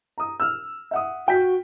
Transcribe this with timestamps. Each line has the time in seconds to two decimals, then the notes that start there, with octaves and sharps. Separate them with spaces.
0.18 A#5 D#6
0.40 E6 F6
0.91 E5 F#5 D#6
1.28 F#4 G5 G6 B6